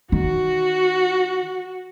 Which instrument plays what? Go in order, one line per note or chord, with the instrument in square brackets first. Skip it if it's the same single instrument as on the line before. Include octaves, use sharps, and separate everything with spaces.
[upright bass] D#3 [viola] F#4